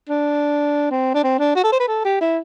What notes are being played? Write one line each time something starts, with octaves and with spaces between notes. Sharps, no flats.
D4
C4
D4
C4
D4
F#4
A4
C5
B4
A4
G4
E4